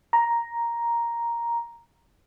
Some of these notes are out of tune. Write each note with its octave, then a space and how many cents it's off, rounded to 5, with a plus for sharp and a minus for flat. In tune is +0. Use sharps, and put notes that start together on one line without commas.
A#5 +5